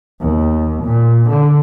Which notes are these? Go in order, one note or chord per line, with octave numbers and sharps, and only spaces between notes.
D#2
A#2
D3